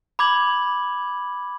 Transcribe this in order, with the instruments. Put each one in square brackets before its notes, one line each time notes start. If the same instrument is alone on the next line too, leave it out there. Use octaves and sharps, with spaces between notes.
[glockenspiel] B5 D6 G#6 F#7